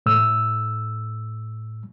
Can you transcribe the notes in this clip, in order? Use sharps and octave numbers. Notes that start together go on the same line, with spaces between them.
A2 E6